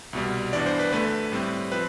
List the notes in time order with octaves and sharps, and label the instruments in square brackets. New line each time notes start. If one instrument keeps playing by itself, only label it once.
[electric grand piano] C2 B2 G3
G2 E3 B3 D4 D5
C5
B4
D2 D3 A3 B4
A2 G3 C4
F3 C4 B4